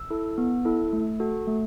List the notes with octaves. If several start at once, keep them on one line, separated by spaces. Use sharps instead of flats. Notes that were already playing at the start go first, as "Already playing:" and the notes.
Already playing: E6
E4 A4
B3
E4 A4
A3
F#4 A4
A3